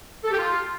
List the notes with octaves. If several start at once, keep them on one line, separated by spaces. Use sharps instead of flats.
A4
G4
F4